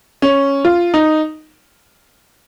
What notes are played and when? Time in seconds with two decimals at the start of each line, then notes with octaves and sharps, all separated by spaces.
0.22 C#4
0.65 F4
0.94 D#4